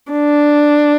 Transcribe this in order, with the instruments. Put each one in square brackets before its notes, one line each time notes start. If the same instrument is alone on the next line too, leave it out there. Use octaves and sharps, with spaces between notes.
[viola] D4